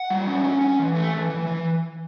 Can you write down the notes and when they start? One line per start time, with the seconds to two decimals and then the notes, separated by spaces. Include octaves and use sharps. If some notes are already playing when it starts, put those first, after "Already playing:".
Already playing: F#5
0.10 G3
0.27 C#4
0.44 C#4
0.61 C#4
0.79 E3
0.95 A3
1.14 E3
1.30 E3
1.47 E3